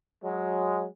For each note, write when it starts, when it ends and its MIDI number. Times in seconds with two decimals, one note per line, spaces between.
0.23 0.86 54
0.23 0.86 56